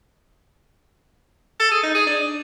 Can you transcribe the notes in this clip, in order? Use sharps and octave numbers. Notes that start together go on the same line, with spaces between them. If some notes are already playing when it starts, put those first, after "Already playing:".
A4
G#4
D#4
G#4
D4